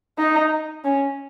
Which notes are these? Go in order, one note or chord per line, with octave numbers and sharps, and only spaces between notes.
D#4
C#4